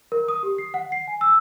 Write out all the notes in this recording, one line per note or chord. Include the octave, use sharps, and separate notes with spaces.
A#4
D#6
G4
C7
F#5
C7
G#5
E6